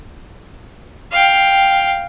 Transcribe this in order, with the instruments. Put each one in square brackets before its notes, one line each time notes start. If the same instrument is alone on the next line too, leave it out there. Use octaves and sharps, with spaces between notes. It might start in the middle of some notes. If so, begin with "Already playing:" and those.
[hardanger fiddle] F5 G5